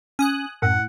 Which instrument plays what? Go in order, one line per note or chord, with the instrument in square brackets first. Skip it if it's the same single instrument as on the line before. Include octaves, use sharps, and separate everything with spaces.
[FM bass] C#4 [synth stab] G#5 D#6 F#6
[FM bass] F#2 [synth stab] A2 [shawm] F#5